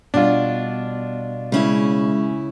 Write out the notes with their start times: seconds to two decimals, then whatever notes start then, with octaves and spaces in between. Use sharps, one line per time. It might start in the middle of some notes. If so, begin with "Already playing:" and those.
0.14 B2 G3 D4 F4
1.52 C#3 G#3 C#4 E4